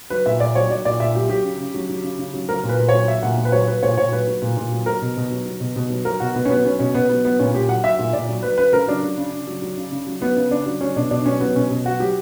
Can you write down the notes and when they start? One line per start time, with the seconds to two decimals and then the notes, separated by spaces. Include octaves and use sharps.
0.10 F#3 B4
0.26 A#2 E5
0.40 A#2 D5
0.55 F#3 C#5
0.70 F#3 D5
0.85 A#2 D5
1.00 A#2 E5
1.15 F#3 G4
1.29 F#3 G4
1.44 C#3
1.60 C#3
1.74 F#3
1.89 F#3
2.04 C#3
2.19 C#3
2.34 F#3
2.49 F#3 A#4
2.63 A#2
2.69 B4
2.79 A#2
2.89 C#5
2.94 F#3
3.08 F#3 E5
3.23 A#2 F#5
3.37 A#2
3.45 B4
3.52 F#3 C#5
3.67 F#3 B4
3.83 A#2 C#5
3.97 A#2 C#5
4.12 F#3 B4
4.27 F#3
4.42 A#2
4.57 A#2
4.72 F#3
4.86 F#3 A#4
5.02 B2
5.17 B2
5.31 F#3
5.46 F#3
5.60 B2
5.76 B2
5.90 F#3
6.05 F#3 A#4
6.20 B2 F#4
6.35 B2 B3
6.45 C#4
6.50 F#3 B3
6.65 F#3 C#4
6.79 B2 C#4
6.94 B2 B3
7.09 F#3 B3
7.24 F#3 B3
7.39 A#2 C#4
7.54 A#2 G4
7.68 F#3 F#5
7.84 F#3 E5
7.99 A#2
8.13 A#2 D5
8.29 F#3
8.43 F#3 B4
8.58 C#3 B4
8.73 C#3 A#4
8.87 F#3 D4
9.03 F#3
9.17 C#3
9.32 C#3
9.47 F#3
9.62 F#3
9.77 C#3
9.92 C#3
10.07 F#3
10.21 F#3 B3
10.37 C#3
10.51 C#3 D4
10.66 F#3
10.81 F#3 C#4
10.96 B2 D4
11.11 B2 D4
11.26 F#3 C#4
11.40 F#3 B3
11.55 B2 C#4
11.70 B2
11.85 F#3 F#4
12.00 F#3 G4